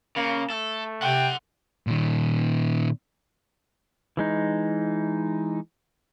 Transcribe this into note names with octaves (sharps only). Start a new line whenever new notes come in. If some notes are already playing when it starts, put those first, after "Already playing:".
C#3 A#3
A3 A4
C3 F#5 G5 C6
A#2 D#3
E3 G#3 D#4